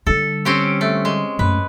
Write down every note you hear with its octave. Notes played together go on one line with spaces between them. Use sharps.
D3 G3 A4
C4 C#4 G4
A3
G#3
F#2 A3 B4